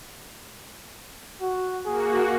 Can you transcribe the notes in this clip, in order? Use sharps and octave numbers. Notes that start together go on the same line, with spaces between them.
F#4
A#3 F#4 G#4